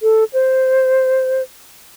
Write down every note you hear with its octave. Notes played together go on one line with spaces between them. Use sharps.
A4
C5